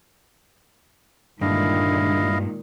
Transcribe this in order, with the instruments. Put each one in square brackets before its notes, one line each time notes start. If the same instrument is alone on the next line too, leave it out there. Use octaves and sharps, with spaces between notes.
[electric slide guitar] G2 [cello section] A#2 D#3 G#3 [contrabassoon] D3 [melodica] E4 D#5 F5